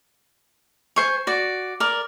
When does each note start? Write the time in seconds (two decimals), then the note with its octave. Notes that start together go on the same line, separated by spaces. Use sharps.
0.96 C5 G#5 C#6
1.27 F#4 D5
1.80 A#4 D5